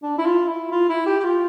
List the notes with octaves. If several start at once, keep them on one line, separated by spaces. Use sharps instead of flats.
D4
E4
F4
E4
F4
E4
G4
G4
F4